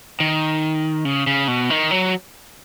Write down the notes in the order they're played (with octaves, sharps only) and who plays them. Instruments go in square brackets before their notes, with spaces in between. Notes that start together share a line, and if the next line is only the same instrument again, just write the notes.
[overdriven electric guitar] D#3
C#3
C#3
B2
D#3
F#3